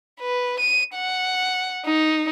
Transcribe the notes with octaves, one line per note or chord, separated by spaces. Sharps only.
B4
D#7
F#5
D#4